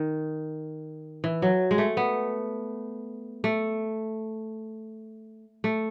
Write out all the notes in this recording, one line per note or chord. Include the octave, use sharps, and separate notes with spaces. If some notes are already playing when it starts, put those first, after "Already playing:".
Already playing: D#3
E3
F#3
G#3
A3
B3
A3
A3